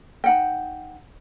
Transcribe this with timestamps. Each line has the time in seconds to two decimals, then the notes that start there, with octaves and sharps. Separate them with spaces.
0.24 D#4 F#5 G5